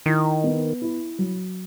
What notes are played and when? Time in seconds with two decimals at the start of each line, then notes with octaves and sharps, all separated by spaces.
0.06 D#3 E4
0.44 B3
0.82 E4
1.19 F#3